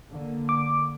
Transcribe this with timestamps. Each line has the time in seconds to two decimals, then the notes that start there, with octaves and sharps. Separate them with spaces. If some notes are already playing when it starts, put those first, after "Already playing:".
0.12 D3 A#3
0.49 D6